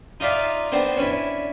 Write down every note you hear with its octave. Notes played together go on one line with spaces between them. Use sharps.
D#4 F4 D5 E5 F5
B3 C4 D4 C5
C#4 D4 E4